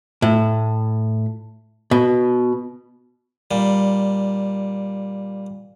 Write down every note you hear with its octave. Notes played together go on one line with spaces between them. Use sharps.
A2
B2
A#2 G3